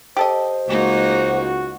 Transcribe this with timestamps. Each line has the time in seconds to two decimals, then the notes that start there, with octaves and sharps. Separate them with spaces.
0.17 G4 A4 C5 D#5
0.68 C#2 G#3 A#3 D#4 F#4